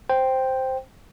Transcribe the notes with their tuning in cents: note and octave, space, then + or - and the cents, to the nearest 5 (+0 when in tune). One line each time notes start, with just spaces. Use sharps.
C5 +0 G5 +0